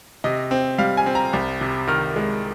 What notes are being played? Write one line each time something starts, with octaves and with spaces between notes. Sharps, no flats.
C3 D#5
C4
G3 F5
G#5
C4
A#5
C2
C3
D#3 F6
G#3